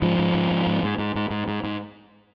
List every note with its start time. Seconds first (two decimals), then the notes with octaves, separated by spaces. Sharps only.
0.02 G#2 F3
0.19 G#2
0.34 G#2
0.51 G#2
0.67 G#2
0.83 G#2
0.98 G#2
1.15 G#2
1.30 G#2
1.48 G#2
1.64 G#2